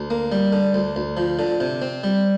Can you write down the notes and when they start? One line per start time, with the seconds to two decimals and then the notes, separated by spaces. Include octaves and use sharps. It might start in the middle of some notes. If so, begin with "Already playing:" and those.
Already playing: D2
0.10 A#3
0.32 G3
0.52 D3
0.74 D2
0.96 D2
1.17 F3
1.39 D3
1.60 C3
1.82 C4
2.04 G3